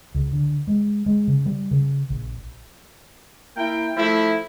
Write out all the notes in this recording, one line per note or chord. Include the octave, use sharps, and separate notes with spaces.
C#2
D3
G#3
G#3
C#3
G3
C#3
A#1
A#3 E4 G5
F3 A3 E4